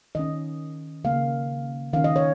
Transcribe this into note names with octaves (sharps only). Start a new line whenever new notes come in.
D#3 C#4 D#5
C#3 A#3 C#4 F5
D#3 C#4 F5
D#5
C#5